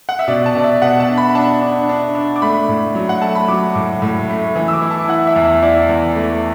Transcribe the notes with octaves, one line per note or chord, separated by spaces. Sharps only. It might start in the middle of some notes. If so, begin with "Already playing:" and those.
F#5
E5
B2 D5
A5
B2 D5
E5
B2 F#5
A5
D4
B5
D4 A5
D4
D4
D4
D6
A3 B5
A2
F#3
F#5
A3 A5
B5
F#3 D6
A2
A2
A3
E3
E6
D6
E4
A5
E4 F#5
E5
E2
E5
E4 D5
E2
A3